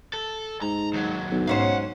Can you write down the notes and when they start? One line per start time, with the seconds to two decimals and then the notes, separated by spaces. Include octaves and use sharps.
0.14 A4
0.62 G#2 A#5
0.93 D#2 F#3
1.31 B1
1.47 G#2 C#4 C5 F5 F#5